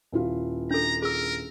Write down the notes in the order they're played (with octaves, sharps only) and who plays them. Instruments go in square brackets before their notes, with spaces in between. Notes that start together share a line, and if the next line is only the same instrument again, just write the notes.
[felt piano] D#1 E4 F4
[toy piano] D4 A4 [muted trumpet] A#5
[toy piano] G#4 E6 [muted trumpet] A#4